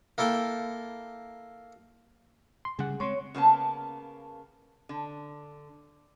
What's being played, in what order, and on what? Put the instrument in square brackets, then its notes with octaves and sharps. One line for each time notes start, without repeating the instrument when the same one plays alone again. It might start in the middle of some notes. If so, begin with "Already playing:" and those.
[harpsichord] A#3 E4 A4 G5
[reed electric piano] C6
[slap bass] C#3 G3 [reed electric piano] G#4 F#5
[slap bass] G#3 C4 [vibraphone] C#5 [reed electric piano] C6 C#6
[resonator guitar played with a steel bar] C#3 A#3 B3 A5
D3